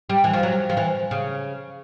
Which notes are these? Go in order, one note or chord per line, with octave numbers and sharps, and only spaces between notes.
G3
E3
F3
F#3
F3
E3
C#3